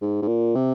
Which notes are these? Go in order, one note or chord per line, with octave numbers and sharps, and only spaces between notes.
G#2
G#2
A#2
C3